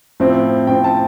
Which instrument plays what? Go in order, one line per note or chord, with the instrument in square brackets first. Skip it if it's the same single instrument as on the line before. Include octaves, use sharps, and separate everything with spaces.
[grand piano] A2 F3 C4
A2 F3 C4 G5
A5